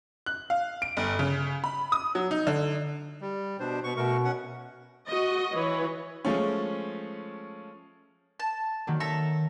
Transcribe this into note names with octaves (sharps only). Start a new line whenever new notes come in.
F#6
F5
D7
G1
C#3
B5
D#6
F#3
D#4
D3
G3
B2 D4 C5
B2 C#6
B2 A3 A#4 C#6
C#4 F#5
F#4 D#5
E3 B4 C#5
F3 G#3 A3 C#4
A5
D#3 F#3 A#3
A4 E5 A#5